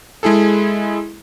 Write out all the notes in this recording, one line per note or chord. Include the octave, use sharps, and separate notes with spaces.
G#3 E4 G#4 A4